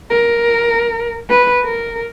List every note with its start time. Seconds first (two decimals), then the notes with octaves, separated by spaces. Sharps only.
0.10 A#4
1.29 B4
1.65 A#4